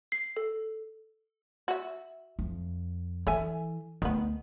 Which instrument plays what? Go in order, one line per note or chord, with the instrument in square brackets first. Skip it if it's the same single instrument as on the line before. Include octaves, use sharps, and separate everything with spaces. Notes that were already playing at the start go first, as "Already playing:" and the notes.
[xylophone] C7
A4
[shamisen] F#4 E5
[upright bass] F2
[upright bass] E3 [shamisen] A4 E5 G#5
[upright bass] D2 [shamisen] D#3 B3